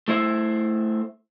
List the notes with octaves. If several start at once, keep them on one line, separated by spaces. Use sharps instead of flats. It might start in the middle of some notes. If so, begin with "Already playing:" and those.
A3 E4 C5 E5